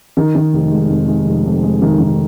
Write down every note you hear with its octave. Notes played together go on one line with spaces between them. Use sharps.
D#3
D#3
F1
G#3
F2
G#3
F1
F2
G#3
D#3
D#3